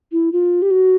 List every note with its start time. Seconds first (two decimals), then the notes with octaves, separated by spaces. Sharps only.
0.12 E4
0.32 F4
0.62 G4
0.71 F#4